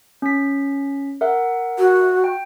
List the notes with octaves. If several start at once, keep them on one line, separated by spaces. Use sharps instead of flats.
C#4 B6
A#4 E5 F#5
F#4
G5